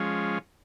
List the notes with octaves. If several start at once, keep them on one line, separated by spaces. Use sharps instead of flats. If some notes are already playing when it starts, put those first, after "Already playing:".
Already playing: F3 G#3 C#4